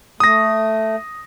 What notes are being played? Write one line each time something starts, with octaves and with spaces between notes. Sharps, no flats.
A3 D#6 A#6